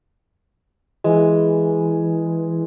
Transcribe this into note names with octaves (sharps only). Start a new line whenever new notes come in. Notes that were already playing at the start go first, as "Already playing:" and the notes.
E3 G#3